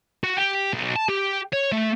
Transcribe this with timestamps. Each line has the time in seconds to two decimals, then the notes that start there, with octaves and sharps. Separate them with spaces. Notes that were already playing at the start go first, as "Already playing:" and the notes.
0.24 F#4
0.37 G4
0.74 B1
0.96 A5
1.09 G4
1.53 C#5
1.72 A3